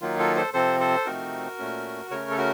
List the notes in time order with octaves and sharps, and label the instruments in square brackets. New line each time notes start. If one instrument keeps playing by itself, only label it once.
[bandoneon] D#3 F#3 A#3 D#4 F4
F4 A4
A4 C5
C3 F3 C4 A4 C5
A4 C5
C3 F3 A3 C4 D#4 F#4 A#4
A#2 A3 C#4
C#3 A3 C#4 A#4 C#5
A4
F#4 A#4